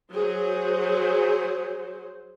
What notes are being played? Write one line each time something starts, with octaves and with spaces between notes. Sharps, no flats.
F#3 G#4 C5